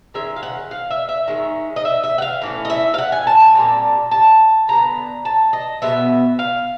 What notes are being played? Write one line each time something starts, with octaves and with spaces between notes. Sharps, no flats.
D#3 G#3 C#4 E5
F5
F#5
F5
E5
E5
D#3 G#3 C#4
D#5
E5
E5
F#5
F5
A2 E3 C#4
D#5
E5
F5
F#5
G#5
A5
G#5
A#2 G3 C4 A5
A5
D3 G3 B3 A#5
A5
D#5
B2 G#3 B3 E5
F5